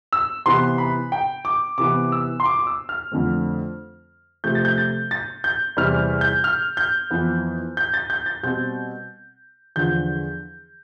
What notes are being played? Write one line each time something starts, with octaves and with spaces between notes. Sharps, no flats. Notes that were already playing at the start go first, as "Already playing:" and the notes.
E6
C3 E3 B3 C6
B5
G5
D6
C3 E3 B3 D6
E6
C6
D6
D6
E6
F6
F2 D3 A3 C4
C3 F3 A3 G6
A6
G6
A6
A6
G6
E2 C3 E3 G3 F6
G6
F6
G6
F2 E3 B3
G6
A6
G6
A6
B2 G3 C4 G6
E2 D3 F3 G6